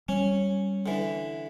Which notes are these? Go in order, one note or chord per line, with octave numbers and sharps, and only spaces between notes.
G3 C#4
D3 E3